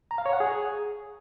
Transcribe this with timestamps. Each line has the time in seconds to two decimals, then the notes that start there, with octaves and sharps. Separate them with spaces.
0.11 A#5
0.18 F5
0.26 C#5
0.33 F#5
0.40 G#4